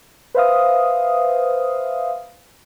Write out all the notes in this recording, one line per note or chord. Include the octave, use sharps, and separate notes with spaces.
B4 C5 E5 F5 D#6